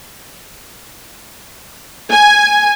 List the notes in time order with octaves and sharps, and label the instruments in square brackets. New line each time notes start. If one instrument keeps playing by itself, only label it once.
[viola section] G#5